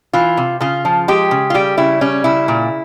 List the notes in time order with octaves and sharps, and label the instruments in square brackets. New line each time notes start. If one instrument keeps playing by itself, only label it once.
[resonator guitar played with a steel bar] E3 F4
C3
C#3 F4
F3
G#3 G4
C#3
F4
G3 G4
C#3 E4
G3 C#4
C#3 E4
A#2